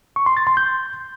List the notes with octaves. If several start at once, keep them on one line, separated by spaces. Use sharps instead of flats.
C#6
C6
A6
C6
G6